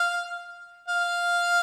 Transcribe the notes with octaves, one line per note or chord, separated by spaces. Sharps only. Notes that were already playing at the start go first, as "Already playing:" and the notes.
Already playing: F5
F5